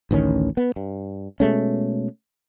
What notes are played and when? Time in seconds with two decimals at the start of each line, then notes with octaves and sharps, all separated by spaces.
0.11 A1 D2 D#3 C#4
0.57 B3
0.76 G2
1.40 B2 G#3 A3 C#4